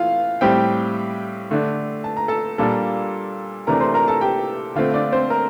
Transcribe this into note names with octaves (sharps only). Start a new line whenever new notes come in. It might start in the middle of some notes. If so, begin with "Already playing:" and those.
Already playing: E3 A3 F4 F5
A2 G3 C4 G4 G5
D3 A3 D4
A5
A#5
A4 A5
A#2 G3 A#3 D4 A4 A5
C3 E3 A3 D4 A#4 A#5
C5 C6
A#4 A#5
A4 A5
G4 G5
D3 A3 C4 F4 F5
D4 D5
C4 C5
A#4 A#5